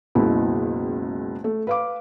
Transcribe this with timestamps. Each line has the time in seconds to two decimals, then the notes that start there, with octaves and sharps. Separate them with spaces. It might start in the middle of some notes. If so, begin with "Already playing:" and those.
0.15 F#1 C#2 B2 E4
1.44 A3
1.67 B4 F5 D6